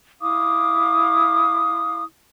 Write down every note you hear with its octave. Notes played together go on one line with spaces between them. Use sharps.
E4 F5 D6 D#6